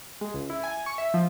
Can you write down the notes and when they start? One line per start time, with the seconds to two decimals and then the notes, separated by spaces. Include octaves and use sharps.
0.21 G#3
0.34 C#2
0.50 E4
0.63 G#5
0.86 C#6
0.98 E5
1.14 F3